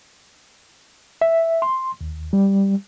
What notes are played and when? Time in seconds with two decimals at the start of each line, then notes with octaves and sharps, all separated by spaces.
1.22 E5
1.62 C6
2.01 D#2
2.33 G3